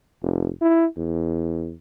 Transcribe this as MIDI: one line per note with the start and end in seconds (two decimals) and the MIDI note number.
0.23 0.49 29
0.61 0.85 64
0.97 1.74 40